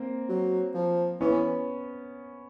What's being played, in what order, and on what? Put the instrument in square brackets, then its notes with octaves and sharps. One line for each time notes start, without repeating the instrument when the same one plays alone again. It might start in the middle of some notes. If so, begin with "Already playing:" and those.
Already playing: [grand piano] A#3 C4
[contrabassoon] F#3
F3
[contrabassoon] E3 [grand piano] B3 C#4